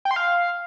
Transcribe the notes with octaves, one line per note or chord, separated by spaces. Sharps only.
G5
C6
F5